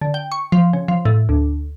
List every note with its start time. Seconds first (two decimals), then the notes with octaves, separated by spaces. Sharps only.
0.01 D3
0.14 G5
0.32 C#6
0.52 F3
0.73 C#3
0.88 F3
1.05 A2
1.29 D2